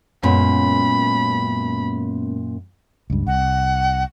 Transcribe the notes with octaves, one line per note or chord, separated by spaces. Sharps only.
F#2 A#2 G#3 B3 C#4 B5
C#2 G2
C2 F#5